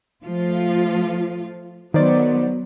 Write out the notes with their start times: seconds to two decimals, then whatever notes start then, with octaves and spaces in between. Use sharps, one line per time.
0.24 F3 A3 F4
1.94 D#3 F#3 B3 C5 D5